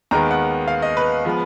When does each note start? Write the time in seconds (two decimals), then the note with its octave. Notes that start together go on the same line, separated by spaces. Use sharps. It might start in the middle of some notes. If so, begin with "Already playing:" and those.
0.11 D#2 D#3 G#3 B3 A#5
0.31 F#5
0.68 F5
0.82 D#5
0.97 B4
1.25 F3 G#3 B3